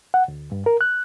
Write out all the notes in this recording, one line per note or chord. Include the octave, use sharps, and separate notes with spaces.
F#5
D2
G2
A#4
F#6